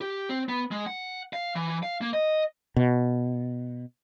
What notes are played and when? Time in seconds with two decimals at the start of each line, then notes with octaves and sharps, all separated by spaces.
0.01 G4
0.29 C4
0.49 B3
0.71 G#3
0.87 F#5
1.33 F5
1.55 E3
1.83 F5
2.01 A#3
2.13 D#5
2.76 B2